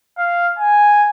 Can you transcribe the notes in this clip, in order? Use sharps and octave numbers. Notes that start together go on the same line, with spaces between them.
F5
G#5